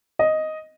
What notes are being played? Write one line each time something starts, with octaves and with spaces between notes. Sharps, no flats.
D#5